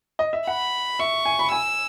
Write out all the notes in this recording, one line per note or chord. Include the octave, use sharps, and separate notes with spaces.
D#5
E5
F#5 B5
E5 C#6
G#5
B5
G#5 E6